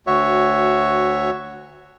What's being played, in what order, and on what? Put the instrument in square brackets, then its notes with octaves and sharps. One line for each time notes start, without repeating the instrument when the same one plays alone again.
[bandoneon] D2 F#4 C#5 E5